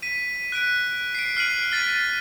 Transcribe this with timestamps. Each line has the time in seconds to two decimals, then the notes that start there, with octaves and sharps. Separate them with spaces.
0.02 B6 D#7
0.52 F#6 B6 D7
1.15 C7 D7
1.36 F6 F#6 C7 D7 D#7 F#7
1.71 F6 A6 B6 C7 D#7